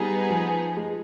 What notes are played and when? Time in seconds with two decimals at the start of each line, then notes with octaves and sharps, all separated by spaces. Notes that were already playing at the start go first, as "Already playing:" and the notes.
Already playing: G3 B3 D#4 G#4
0.30 F3
0.77 G#3